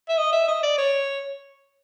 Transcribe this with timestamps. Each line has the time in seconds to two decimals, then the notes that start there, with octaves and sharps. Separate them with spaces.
0.09 E5
0.18 D#5
0.33 E5
0.48 D#5
0.63 D5
0.78 C#5